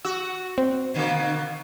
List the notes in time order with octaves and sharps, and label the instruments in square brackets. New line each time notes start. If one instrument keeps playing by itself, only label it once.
[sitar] F#4 [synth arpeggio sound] E6
[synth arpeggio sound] C4
[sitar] B2 D3 A#3